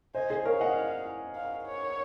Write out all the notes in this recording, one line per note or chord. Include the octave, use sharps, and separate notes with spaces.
C5 D#5 G#5
G#4 C5
A#4 C#5 F5
D#5 F#5
F5
C#5